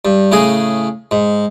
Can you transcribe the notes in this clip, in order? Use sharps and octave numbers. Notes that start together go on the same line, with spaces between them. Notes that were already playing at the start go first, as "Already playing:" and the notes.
G2
A2 C#3 G#4
G#2